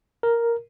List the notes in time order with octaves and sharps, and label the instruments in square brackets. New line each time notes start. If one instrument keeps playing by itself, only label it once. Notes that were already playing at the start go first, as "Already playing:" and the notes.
[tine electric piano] A#4